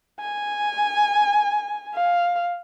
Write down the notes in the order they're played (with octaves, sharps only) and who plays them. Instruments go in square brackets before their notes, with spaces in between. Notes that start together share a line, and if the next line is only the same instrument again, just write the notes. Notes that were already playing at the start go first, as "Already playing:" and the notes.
[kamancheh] G#5
F5